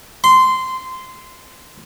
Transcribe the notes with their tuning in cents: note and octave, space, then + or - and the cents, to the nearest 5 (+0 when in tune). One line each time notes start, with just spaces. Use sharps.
C6 -15